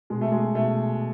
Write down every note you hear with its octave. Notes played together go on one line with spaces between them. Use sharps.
B2 G#3
A3
G#3
B2 A3